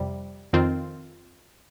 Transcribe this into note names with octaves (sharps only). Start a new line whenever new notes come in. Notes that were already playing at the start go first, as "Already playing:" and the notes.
Already playing: F2 C3 G3
F2 D#3 C4 F4